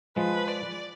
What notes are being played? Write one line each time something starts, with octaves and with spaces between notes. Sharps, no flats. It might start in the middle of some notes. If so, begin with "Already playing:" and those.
F3 G#3 B4
D5